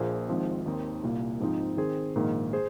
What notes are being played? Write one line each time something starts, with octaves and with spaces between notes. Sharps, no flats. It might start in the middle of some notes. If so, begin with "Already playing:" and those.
Already playing: A#1 A#2 A#3 G#4 C5
G#1 G#2 F3 C4
D#2 D#3 C4 D#4
C2 A#2 A#3
G#2 F3 C4 D#4
D#3 C4 G#4 C5
A#1 G#2 D#3 A#3
G#4 C5